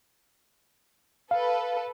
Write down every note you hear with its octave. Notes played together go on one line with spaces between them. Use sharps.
A4 B4 F5